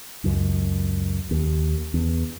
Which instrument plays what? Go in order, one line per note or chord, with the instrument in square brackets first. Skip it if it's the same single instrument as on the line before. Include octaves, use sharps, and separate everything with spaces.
[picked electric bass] C#2 F#2
D#2
E2